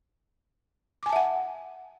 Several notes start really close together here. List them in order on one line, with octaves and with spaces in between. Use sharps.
D6 G#5 A5 E5 F#5